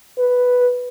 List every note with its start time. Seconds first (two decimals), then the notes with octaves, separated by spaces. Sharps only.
0.19 B4